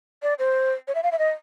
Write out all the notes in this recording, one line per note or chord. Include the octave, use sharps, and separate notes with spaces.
D5
C5
C#5
E5
F5
E5
D#5